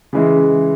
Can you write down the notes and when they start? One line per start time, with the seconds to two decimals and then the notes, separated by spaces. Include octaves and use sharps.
0.13 C#3 E3 G#3 E4